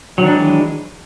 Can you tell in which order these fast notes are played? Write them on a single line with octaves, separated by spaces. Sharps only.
F#3 D#3 D4 G#3 E3